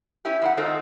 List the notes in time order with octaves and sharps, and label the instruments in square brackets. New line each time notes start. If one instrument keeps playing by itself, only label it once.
[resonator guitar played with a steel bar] C#4 E4 G4
F2 E4 F#5
D#3 G#3 C4 D#4 F4 A4